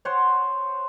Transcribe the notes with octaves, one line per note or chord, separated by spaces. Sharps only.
C5 C#5 F#5 C6